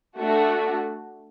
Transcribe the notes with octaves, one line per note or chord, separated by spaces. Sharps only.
A3 D4 F#4